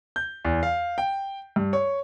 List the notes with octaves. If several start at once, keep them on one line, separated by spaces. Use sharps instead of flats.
G6
E2
F5
G5
G2
C#5